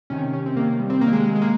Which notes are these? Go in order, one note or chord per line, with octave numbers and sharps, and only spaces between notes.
C3 D#3 C#4
C#4
C4
C3 D#3 A#3
G3
C4
C3 D#3 A#3
G#3
G#3
G#3
A#3